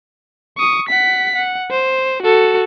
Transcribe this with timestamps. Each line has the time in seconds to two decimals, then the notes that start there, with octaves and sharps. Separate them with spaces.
0.58 C#6 D#6
0.89 F#5 B6
1.36 F#5
1.71 C5
2.22 F#4 A4